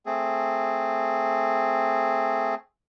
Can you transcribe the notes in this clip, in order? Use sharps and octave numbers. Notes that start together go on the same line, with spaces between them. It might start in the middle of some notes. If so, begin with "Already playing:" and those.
A3 C4 G#4